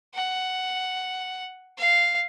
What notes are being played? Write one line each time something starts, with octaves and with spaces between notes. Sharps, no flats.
F#5
F5